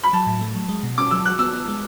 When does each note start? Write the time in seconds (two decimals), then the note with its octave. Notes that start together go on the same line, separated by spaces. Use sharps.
0.03 B5
0.13 F#3 A5
0.27 A2
0.41 A3
0.56 F#3
0.69 G#3
0.83 B2
0.98 C#4 D6
1.11 F#3 E6
1.25 F#4 F#6
1.39 B3 E6
1.53 B3
1.68 G#3